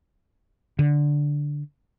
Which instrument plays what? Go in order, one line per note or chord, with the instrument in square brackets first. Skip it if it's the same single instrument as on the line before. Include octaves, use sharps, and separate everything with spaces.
[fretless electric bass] D3